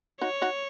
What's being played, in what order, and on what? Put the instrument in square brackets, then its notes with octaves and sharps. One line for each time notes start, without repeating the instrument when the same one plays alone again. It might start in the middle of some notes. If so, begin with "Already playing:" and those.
[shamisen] D#4 F#4 [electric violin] C#5
[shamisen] D#4 F#4